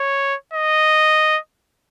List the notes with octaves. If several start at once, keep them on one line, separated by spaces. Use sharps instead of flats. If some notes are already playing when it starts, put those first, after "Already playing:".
Already playing: C#5
D#5